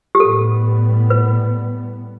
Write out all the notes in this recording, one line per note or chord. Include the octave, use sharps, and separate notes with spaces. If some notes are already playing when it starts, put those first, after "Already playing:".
G4
A2 G3 B3 A4
B4